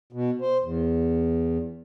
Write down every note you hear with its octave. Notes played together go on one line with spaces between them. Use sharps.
B2
C5
E2